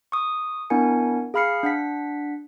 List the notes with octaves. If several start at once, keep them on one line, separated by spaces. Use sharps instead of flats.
C#6 D#6
B3 D4 E4 A#4 G#5 C#7
G#4 F5 B5 F6 C7 C#7
D4 F#5 B6